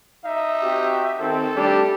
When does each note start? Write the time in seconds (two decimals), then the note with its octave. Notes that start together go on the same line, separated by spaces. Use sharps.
0.25 D#4 E5
0.62 C4 F#4 G4
1.19 D#3 C4 A4
1.56 G3 A3 D4 G4